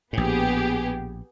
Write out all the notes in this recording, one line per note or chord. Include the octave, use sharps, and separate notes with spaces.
A#1 A2 B3 G4 G#4